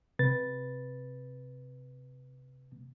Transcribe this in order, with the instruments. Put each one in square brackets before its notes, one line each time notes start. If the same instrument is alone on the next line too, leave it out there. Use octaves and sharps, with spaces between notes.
[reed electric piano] C3 B4 A6